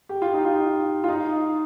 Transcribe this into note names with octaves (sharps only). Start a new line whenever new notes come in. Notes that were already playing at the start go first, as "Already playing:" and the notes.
G4
F4
D#4
F4
F4
D#4